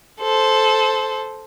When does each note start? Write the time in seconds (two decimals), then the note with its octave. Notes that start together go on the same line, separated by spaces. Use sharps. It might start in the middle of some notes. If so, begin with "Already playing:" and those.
0.21 A4 C5